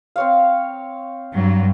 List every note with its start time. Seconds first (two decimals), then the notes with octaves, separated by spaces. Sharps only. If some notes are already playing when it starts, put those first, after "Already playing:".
0.16 C4 C#5 F5
1.32 G2 F#3